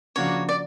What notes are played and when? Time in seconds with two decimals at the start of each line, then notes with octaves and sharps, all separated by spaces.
0.16 C#3 F3 A#3 D4 F#4 C#5
0.49 D5